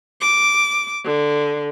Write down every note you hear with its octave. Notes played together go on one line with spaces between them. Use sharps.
D6
D3